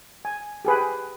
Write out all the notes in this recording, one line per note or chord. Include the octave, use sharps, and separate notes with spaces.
G#5
G4 G#4 B4